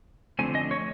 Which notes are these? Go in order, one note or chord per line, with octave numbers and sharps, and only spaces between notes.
D3 F3 A3 C4 G#5
D#5
C#5